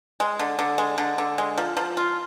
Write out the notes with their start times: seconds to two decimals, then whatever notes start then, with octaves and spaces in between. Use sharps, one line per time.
0.20 G#3
0.39 D3
0.59 D3
0.78 G#3
0.98 D3
1.18 D3
1.38 G#3
1.58 F3
1.77 F3
1.97 F4